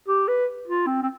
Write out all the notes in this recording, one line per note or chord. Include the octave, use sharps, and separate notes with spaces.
G4
B4
F4
C4
C4